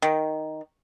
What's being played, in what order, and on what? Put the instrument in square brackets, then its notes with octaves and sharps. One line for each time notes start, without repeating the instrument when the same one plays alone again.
[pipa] D#3